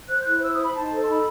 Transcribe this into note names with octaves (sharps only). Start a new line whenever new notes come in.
C5 F#6
G6
E4 F#6
C5 E6
D#6
C5 B5
D#4 A5
A4
C6
D#4 B5